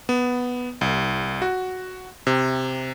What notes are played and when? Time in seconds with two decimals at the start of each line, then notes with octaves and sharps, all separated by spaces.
0.09 B3
0.81 C2
1.42 F#4
2.27 C3